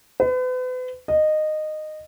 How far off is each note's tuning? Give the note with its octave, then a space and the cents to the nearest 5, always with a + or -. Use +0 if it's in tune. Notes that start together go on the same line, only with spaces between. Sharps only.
B4 +40
D#5 -15